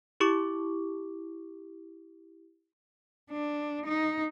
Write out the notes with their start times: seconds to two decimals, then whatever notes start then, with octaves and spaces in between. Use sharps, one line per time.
0.20 E4 G4 C#6 D6
3.32 D4
3.86 D#4